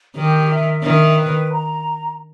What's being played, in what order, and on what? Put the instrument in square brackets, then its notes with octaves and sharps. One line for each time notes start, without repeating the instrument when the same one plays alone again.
[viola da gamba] D#3 [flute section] G4
[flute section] E5
[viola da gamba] D#3 [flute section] E5
[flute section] B4
A#5